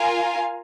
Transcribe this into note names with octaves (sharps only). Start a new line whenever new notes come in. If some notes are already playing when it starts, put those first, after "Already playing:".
Already playing: F4 A#4 F5 G#5